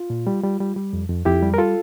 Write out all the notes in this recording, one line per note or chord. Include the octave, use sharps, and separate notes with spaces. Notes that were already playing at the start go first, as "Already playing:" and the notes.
Already playing: F4
A#2
G3
G3
G3
G3
F2
F2
F2 E4 G4
G3
A#4
F4 A4